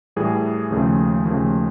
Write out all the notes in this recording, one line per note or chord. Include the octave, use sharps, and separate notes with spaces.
A2 E3 G3 G#4
D#2 C#3 F3 A3
D#2 C#3 F3 A3